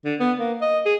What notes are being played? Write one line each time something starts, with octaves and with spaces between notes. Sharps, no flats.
D3
B3
A#3
D#5
G#4